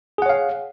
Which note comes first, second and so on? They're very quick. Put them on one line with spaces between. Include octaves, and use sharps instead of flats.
G#4 F#5 C#5 F5